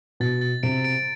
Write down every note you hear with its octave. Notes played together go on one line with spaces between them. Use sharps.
B2 A6
A6
C3 D7
D7